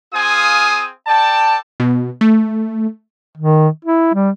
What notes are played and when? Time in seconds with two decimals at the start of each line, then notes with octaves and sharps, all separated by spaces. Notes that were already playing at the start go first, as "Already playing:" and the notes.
0.14 C4 F4 G#4 F5 G#5 D#6
1.07 A4 D5 G5 A5
1.80 B2
2.21 A3
3.37 D#3
3.85 E4
4.14 G3